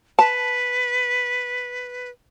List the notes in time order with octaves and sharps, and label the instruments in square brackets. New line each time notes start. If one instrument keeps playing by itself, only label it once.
[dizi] B4 [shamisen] A5